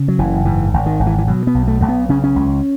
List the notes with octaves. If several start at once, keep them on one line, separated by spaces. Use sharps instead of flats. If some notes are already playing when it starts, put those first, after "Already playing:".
Already playing: C#3
F#3
F#1 E3
G#2 E3
G#1
D#3
G#1
E3
E3
B2 F#3
B3
B1
A3
B1 A3
B3
C#3 C#4
C#4
C#2